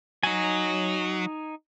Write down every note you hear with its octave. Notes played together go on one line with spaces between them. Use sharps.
F#3 D#4 G#5